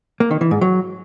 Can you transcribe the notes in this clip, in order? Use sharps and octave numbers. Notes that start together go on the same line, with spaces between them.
A#3
D#3
E3
G#2
F#3